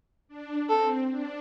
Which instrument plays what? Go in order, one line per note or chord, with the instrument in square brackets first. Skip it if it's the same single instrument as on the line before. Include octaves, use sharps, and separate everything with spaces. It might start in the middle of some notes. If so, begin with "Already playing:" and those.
[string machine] D4
[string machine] C4 [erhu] A4
[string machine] D4